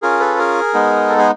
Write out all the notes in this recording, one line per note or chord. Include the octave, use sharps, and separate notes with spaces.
C#4 F4 G#4 A#4
A4 B4
G#4 A#4
G#3 B3 D#4
A4
G#4